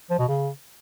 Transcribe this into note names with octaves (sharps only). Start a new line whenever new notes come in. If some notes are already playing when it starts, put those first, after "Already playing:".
F3
B2
C#3